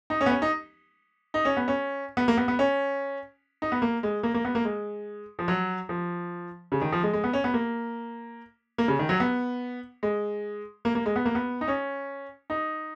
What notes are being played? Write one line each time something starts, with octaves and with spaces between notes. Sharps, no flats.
D#4
C#4
B3
C#4
D#4
D#4
C#4
B3
C#4
B3
A#3
B3
B3
C#4
D#4
B3
A#3
G#3
A#3
A#3
B3
A#3
G#3
F3
F#3
F3
C#3
D#3
F3
G#3
G#3
B3
C#4
B3
A#3
A#3
C#3
D#3
F#3
B3
G#3
A#3
A#3
G#3
B3
A#3
B3
D#4
C#4
D#4